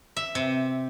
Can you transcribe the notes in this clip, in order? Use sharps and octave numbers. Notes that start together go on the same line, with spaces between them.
E5
C3